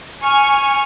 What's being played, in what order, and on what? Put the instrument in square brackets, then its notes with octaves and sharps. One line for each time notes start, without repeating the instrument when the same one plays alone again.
[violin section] G#5 C#6 F6